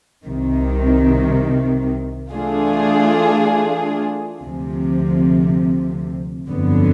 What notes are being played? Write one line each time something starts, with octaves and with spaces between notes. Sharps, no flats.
C2 C3 D#3
E3 A3 D4 F4 G#4
D2 C3 F3
G1 F2 D3 F#3 B3